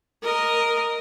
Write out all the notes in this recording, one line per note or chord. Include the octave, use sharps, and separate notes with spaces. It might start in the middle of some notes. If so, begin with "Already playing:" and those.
A#4 D#5